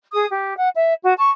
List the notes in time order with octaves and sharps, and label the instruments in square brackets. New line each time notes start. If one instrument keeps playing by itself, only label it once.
[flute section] G#4 D#6
G4
F#5
E5
F#4
A5 C#6